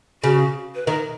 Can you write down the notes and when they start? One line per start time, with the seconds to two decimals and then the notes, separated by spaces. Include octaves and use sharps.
0.23 C#3 F#4
0.75 B4
0.87 D#3 A#4